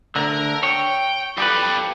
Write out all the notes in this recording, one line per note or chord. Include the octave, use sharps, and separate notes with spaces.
D2 D3 A#4 A#5
C#5 G5
F3 G3 G4 A4 B4